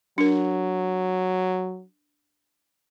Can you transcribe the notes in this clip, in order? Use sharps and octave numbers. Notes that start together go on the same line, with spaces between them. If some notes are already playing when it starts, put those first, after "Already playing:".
F#3 D4 A#4